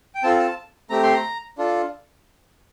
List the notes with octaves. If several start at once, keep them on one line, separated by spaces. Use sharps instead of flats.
G5
C4 F4 A4 A5
A5
A3 C4 G4 A#5
C6
A#5
D4 F4 A4